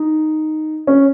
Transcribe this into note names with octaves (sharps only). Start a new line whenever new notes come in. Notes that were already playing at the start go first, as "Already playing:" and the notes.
Already playing: D#4
C#4